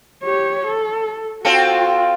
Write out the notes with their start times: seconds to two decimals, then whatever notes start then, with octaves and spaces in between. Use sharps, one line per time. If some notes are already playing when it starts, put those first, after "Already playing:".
0.23 G4 C#5
0.67 A4
1.45 C4 F4 F#4 A4